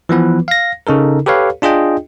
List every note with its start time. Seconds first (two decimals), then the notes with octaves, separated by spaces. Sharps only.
0.09 E3 F3 B3 B4
0.48 F5 A#6
0.87 C#3 D#4 A4 A#4
1.26 G4 A4 B4 C#5 F5
1.62 D4 F4 G#4 D#5 G5